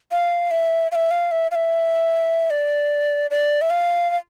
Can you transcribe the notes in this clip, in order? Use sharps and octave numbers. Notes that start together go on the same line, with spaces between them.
F5
E5
F5
E5
F5
E5
F5
E5
D5
D5
E5
F5
F5